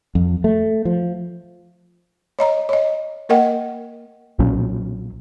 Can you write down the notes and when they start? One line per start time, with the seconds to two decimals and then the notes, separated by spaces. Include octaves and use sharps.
0.15 F2
0.44 A3
0.85 F3
2.39 C#5 D#5 A#5
2.69 C#5 D#5
3.29 A#3 A#4 D#5 F#5 G5
4.39 B1 A#2 F#3 C#4